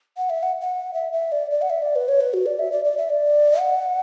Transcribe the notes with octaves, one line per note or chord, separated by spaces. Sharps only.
F#5
E5
F#5
F#5
E5
E5
D5
D5
F#5
E5
D5
B4
C#5
B4
F#4
D5
E5
D5
D5
E5
D5
F#5